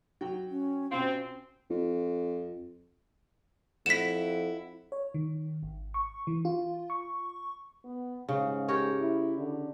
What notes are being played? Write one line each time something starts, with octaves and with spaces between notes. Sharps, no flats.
F#3 F#4 G5
C#4
B2 C4 C#4 F4
F2
F2 E4 F#5 B6 E7
C#5
D#3
G#1
C#6
E3
F4
C#6
B3
G#2 C#3
G4 A#4 C#5
E4
D3